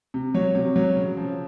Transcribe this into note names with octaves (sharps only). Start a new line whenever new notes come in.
C3
F#3 C#5
C3
F#3
C#3
F3